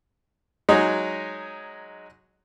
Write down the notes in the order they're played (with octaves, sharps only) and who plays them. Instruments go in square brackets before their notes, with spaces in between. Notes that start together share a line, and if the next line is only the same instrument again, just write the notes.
[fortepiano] F#3 G#3 D#4